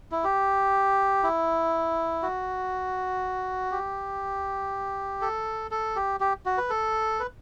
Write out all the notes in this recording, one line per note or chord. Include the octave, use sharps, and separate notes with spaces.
E4
G4
E4
F#4
G4
A4
A4
G4
G4
F#4
B4
A4
B4